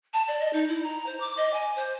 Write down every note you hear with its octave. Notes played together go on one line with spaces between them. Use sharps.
A5
D5
D#5
D#4
E4
A#5
C5
D6
D#5
G#5
C5